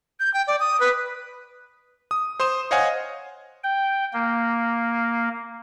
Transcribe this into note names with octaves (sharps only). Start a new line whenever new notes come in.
G6
G5
D5
D#6
B4
D#6
C5 C6 D#6 E7
C5 C#5 D#5 F5 F#5 G#5
G5
A#3